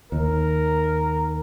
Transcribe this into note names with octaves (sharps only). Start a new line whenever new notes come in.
D#2 A#4